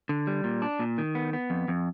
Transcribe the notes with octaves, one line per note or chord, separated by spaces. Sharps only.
D3
G3
A#2
D4
A#2
D#3
B3
B3
F2
F2